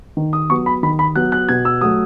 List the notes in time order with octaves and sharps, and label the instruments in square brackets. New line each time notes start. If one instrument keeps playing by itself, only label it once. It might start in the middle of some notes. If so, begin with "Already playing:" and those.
[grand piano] D#3
D#6
F#3 B3 C#6
B5
D#3 B5
B5
F#3 B3 F#6
F#6
B2 G#6
E6
F#3 A3 D#6